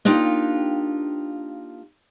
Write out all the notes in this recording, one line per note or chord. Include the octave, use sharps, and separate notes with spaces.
A#3 D4 D#4 F4 G4 G5